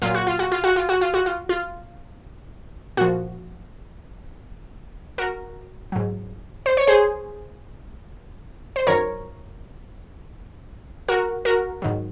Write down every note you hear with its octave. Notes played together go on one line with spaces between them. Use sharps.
A#2 F#3 F4
F#4
F4
F#4
F4
F#4
F4
F#4
F4
F#4
F4
F4
A#2 F3 F#4
F#4 A#4
G#2 F#3
C5
C#5
G#4 C5
C5
F#2 D#3 F#3 A#4 C#5
F#4 A#4
F#4 A#4
G#2 D#3 F#3